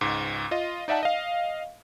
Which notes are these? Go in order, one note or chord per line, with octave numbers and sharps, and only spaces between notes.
C#2 G#2
F4 D#5
D#4 D5 E5 F#5 A5
D#5 F5